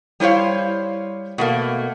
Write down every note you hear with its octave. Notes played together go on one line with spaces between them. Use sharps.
G3 E4 C5 C#5 F5
B2 A3 A#3